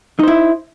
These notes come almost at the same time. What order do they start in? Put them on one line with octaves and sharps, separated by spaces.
D#4 C5 E4